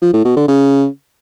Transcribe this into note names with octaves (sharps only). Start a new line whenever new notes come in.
F3
A2
B2
D3
C#3